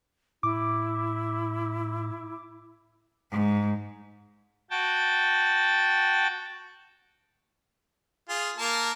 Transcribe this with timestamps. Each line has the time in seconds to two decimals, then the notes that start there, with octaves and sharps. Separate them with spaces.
0.43 A2 E4 D6
3.31 G#2
4.71 F#4 G5 A5
8.29 F4 G#4
8.58 A#3 A#4 A5